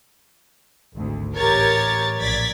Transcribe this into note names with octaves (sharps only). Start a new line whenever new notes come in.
G#1 D2
A1 G4 A#4 C#5 G#6 A6
A#1 D5 G#6 A6 B6